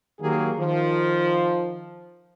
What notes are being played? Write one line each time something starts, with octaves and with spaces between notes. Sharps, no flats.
D#3 F#3 A#3 G4 G#4
D#3 F3